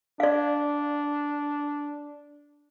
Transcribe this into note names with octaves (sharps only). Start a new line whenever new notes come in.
D4 D5 F5